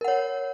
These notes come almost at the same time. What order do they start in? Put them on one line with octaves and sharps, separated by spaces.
A#4 F#5 C#5